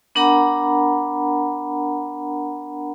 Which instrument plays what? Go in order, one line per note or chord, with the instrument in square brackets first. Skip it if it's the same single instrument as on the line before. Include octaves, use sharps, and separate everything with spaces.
[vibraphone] B3 D4 A#4 F#5 A#5 B5